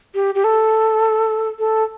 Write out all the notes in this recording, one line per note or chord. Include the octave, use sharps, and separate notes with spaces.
G4
G4
A4
A4